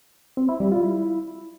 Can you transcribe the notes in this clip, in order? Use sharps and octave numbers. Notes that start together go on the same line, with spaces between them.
C4
E4
G3
F4
E4